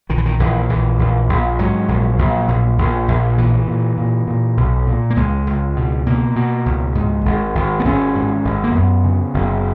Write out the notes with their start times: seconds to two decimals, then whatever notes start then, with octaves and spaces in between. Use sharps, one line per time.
0.09 A#1 D#3
0.18 E3
0.26 D#3
0.39 A#1 E3
0.69 A#1 E3
0.99 A#1
1.29 A#1
1.59 G#2 F#3
1.88 A#1
2.19 A#1
2.48 A#1
2.78 A#1
3.08 A#1
3.38 A#2 E3
3.67 A#2
3.98 A#2
4.27 A#2
4.57 B1
4.87 A#2
5.10 A#3
5.16 C#2 G#3
5.47 C#2
5.76 B2
6.06 B2 A#3
6.36 B2
6.66 C#2
6.95 G#2
7.25 G#1
7.55 G#1
7.80 B3
7.85 G#1 C#4
8.15 G#2
8.45 G#1
8.64 A#3
8.75 F#2 B3
9.04 C#3
9.34 F#1